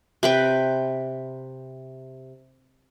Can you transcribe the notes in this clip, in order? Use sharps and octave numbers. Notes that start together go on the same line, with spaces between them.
C3 B4 G5